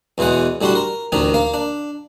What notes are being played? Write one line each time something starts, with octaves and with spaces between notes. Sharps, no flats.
E2 B2 E3 G#3 F#5
A2 G3 D4 F#4 A5 C6
A#4
A1 D2 D#3 D4 D#4
A#3 F5
D4